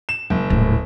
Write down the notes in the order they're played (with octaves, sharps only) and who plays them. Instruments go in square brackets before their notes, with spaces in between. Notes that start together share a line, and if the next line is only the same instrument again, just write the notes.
[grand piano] E7
F#1
[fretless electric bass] D#1 A2